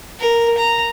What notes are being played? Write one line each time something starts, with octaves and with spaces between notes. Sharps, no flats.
A#4
A#5